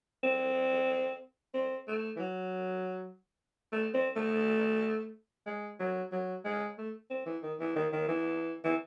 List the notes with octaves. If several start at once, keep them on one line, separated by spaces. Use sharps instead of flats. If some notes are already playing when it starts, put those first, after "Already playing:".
C4
C4
A3
E3
F#3
A3
C4
A3
G#3
F#3
F#3
G#3
A3
C4
E3
D#3
E3
D#3
D#3
E3
E3